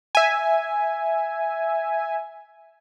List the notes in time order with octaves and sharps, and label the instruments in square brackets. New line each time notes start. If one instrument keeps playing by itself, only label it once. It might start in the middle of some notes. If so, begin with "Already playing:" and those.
[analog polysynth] E5 G#5